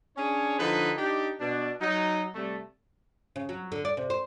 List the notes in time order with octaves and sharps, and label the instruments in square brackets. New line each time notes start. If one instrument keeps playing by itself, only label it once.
[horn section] C#4 D4 G#4 C#5
D3 F3 D#4 E4 B4
D4 D#4 G4
B2 D4
F#3 D#4
C3 G3 A3
[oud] C#3
F#3
D3
D5
C3
C5